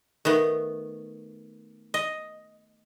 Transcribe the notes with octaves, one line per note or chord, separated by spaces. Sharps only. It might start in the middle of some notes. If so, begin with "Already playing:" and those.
D#3 A3 B3
D#5